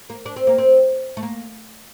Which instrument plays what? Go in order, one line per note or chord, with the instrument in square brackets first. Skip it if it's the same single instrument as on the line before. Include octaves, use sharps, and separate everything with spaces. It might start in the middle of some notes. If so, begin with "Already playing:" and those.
[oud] A#3
D4
C4
A#3
C4
A3
A#3